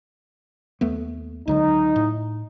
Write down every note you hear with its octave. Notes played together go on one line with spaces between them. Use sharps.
D#2 A3 B3
C#2 D3 F#3 D#4
A2